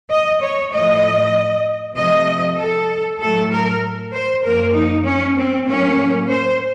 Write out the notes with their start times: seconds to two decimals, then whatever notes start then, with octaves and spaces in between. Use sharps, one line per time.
0.10 D#5
0.41 C#5
0.72 A2 F3 A3 D#5
1.96 C3 F3 A3 D#5
2.57 A4
3.19 A2 F#3 A3 A4
3.51 A#4
4.12 C5
4.43 F#2 F3 A#3 A#4
4.73 D#4
5.04 C#4
5.36 C4
5.66 A2 F#3 A#3 C#4
6.29 C5